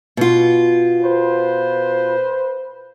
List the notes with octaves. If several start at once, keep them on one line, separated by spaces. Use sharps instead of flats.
B2 F4
B4 C5